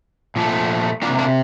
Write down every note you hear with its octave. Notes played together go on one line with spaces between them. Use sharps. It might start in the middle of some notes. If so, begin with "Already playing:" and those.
A#2 F3 A3
C3 D#3 A#3 D4 F4
A#3 D4